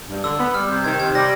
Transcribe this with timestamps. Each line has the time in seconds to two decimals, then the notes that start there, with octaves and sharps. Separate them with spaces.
0.09 G2
0.24 D3 E6
0.39 B3
0.54 G3 F6
0.69 C3 G6
0.84 D#3 G#6
0.99 C3 G#6
1.15 G3 A#6